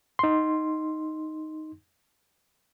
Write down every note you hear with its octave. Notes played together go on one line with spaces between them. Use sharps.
D#4 C6